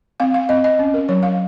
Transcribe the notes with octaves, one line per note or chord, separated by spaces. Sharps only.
C4 F5
F5
C4 D#5
D#5
C#4
A#4
F#3 C#5
F5